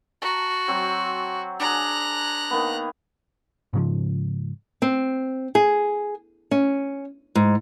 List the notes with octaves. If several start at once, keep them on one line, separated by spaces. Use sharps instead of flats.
F#4 A5 A#5
F#3 C4
D4 G#4 A#5 F#6
D#3 A#3 B3
G#2 C#3 F3
C4
G#4
C#4
G#2